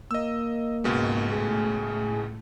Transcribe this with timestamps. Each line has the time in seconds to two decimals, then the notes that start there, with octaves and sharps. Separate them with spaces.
0.11 A#3 D#5 E6
0.84 C#2 G#2 B2 G#3 C#6
1.31 A2 A3 G#4